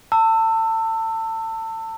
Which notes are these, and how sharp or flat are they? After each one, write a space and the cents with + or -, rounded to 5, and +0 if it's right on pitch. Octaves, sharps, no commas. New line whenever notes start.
A5 +30 E6 +0